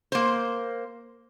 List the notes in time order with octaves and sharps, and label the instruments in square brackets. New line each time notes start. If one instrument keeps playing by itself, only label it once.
[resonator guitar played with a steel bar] A#3 C5